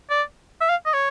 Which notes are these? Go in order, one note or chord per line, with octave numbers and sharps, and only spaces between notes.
D5
E5
F5
D#5
C#5